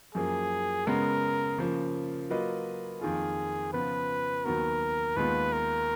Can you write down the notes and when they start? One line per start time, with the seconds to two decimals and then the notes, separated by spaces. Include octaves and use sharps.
0.15 F#2 F3 A#3 G#4
0.87 C#3 G#3 B3 A#4
1.58 C#3 F3 A#3
2.30 F#3 A#3 F4 B4 D#5
3.01 F2 D#3 A#3 F4 G#4
3.73 C#3 F3 B3 F4 B4
4.45 D#2 D#3 F#3 B3 F#4 A#4
5.17 D#2 D#3 G#3 B3 F4 B4
5.53 A#4